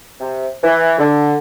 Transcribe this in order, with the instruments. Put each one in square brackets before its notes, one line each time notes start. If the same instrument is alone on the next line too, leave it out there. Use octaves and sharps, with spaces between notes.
[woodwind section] C3
E3
D3